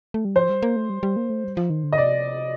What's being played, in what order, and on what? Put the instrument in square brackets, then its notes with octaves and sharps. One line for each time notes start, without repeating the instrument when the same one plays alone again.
[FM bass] A3
G3
[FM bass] F3 [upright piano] C5
[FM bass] G3
A#3
A3
G3
G3
A#3
A3
G3
F3
D#3
D3
[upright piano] D#5
[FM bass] C3 [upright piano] D5